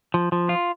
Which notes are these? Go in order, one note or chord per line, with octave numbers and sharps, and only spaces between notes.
F3
F3
F4